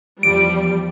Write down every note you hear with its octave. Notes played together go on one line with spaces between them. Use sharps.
E2 F3 G3 D7